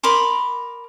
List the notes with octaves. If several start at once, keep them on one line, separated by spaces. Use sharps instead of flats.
A#4 B5 C6 D6